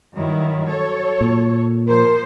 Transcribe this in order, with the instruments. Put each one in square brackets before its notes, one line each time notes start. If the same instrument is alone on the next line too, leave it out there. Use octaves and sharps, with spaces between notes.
[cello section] G2 D#3 E4 [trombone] F#3
[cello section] A4 C#5
[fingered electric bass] A#2
[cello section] F3 C5 [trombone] A#4